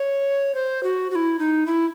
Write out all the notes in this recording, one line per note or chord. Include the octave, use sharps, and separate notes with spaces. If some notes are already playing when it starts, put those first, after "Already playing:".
Already playing: C#5
C5
F#4
F#4
E4
D#4
E4